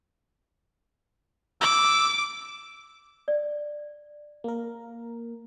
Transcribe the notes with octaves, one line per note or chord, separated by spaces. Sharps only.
D6 E6
D5
A#3 A#4